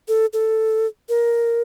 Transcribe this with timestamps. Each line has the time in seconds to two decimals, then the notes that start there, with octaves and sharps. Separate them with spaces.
0.08 A4
0.33 A4
1.09 A#4